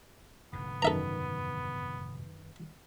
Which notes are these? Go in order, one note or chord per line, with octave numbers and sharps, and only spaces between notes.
F1 G#2 D3 B3
F#2 D#3 A4 B4 E5 A#5